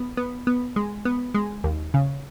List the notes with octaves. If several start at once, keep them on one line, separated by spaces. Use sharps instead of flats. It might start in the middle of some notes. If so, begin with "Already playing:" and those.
Already playing: B3
B3
B3
G#3
B3
G#3
D#2
C#3